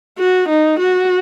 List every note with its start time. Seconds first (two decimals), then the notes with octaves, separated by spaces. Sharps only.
0.19 F#4
0.49 D#4
0.80 F#4